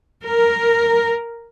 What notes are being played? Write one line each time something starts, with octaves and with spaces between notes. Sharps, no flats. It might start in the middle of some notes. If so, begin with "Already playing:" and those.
A#4